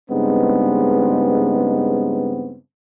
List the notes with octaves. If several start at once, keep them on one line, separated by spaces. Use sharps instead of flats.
G2 C#3 G#3 B3 C4 D#4